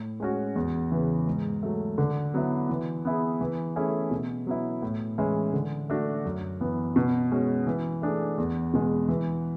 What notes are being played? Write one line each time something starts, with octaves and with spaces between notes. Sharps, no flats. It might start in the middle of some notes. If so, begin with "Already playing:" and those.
Already playing: A2
G#3 C#4 F#4
E2
C#3 E3
G#2
F#3 A3
D3
F#3 B3 E4
E3
B3 E4 G#4
E3
A3 C#4 E4 G#4
B2
F#3 B3 E4
A2
E3 G#3 C#4 E4
D3
A3 D4 F#4
F#2
E3 B3
B2
G#3 C#4 F#4
E3
A3 D4 G#4
E2
B2 G#3
E3